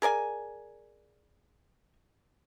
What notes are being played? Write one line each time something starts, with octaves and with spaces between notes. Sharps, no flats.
G#4 A#4 D5 G#5